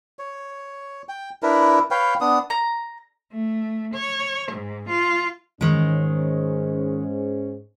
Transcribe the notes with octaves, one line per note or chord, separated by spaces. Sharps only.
C#5
G5
D4 E4 A#4 B4
B4 C#5 F5 G5
B3 D4 D#6
A#5
A3
C#5
G#2
F4
G#2 D#3 G#3 C#4